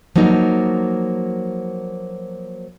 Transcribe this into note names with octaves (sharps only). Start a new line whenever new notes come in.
F3 F#3 A#3 D#4